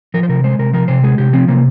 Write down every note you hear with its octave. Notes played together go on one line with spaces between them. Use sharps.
F3 A#4
C5
C3 A#4
G#3 C5
C3 A#4
F3 A#4
C3 C5
G#3 G#4
C3 G4
F3 C4
C3 A#3